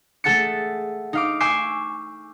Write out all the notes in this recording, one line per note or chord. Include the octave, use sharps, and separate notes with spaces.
A3 G#4 A4 F#5 A6 C#7
D#4 F5 D6
G#5 C#6 D6 E6 G6 C7